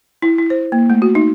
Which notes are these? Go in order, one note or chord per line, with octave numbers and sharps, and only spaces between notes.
E4
E4
C5
A#3
A3
F#4
D#4